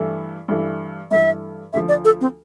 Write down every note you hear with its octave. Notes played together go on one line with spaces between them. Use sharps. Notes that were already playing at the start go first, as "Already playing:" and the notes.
Already playing: G2 E3 A3 E4 A4
G2 E3 A3 E4 A4
G2 E3 A3 E4 A4 E5
D2 D3 F3 E5
D5
A4
C4